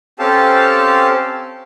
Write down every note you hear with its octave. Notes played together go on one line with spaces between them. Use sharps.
C4 C#4 G4 A4 F5 A5